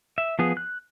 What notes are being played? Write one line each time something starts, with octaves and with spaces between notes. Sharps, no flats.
E5
F3 B3 G#4
F#6